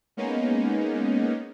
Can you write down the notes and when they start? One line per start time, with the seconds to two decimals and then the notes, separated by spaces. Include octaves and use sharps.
0.17 G#3 A#3 B3 C#4 D#4